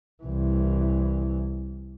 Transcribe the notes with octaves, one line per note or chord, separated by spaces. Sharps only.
C2 E3